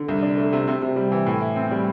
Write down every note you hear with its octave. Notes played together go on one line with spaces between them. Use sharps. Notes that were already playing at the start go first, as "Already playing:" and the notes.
Already playing: D3
C2
D4
A3
C3
C3
C3
G3
E3
A2
E4
C4
G3